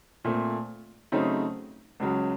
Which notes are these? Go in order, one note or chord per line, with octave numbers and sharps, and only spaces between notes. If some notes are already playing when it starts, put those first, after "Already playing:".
A#2 A3 C4
C#3 F#3 A3 C4 D#4
C#2 C#3 F#3